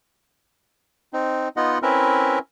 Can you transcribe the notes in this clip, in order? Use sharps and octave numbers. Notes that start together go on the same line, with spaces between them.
C4 D#4
B3 D#4 F4 D#5 F#5
C4 C#4 E4 A#4 B4 E5